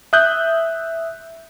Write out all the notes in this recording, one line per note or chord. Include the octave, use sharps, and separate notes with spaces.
E5 D#6 F#6 G6